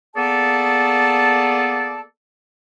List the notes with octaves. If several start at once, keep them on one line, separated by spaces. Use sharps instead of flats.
A#3 B3 G#4 A4 D5 A5